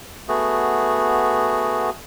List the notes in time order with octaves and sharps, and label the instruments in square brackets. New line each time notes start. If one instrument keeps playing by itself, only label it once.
[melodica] A3 B3 F#4 G#4